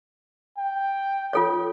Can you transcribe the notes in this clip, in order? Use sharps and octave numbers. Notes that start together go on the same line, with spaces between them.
G5
F4 A4 C#5